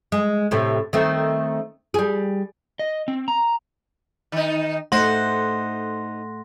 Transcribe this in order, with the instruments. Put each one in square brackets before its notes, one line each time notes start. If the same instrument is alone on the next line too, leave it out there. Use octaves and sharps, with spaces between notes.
[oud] G#3
A2 C3 A4
D#3 A3 C4
G3 G#4
[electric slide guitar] D#5
C4
A#5
[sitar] D#3 D#4
[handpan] A3 F#5 [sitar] D#4 C5 [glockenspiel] C6 A#6